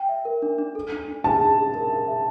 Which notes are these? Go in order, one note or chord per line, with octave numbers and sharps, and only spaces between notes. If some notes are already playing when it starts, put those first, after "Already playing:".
Already playing: G5
E5
A#4
D4
D4
A4
D4
D4
D4 A5
D4
G#4
A#4
E5
E5